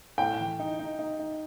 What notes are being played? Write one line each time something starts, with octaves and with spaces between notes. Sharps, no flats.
A2 G5
E3
D#4
D#4
D#4
D#4